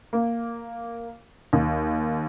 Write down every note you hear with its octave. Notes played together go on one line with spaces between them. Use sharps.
A#3
D#2